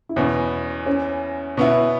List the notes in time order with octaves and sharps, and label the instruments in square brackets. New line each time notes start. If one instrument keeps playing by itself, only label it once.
[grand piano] E4
[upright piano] E2 B2 B3 [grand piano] C#4
[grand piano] C#4
[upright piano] B2 B3 E4 [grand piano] C#4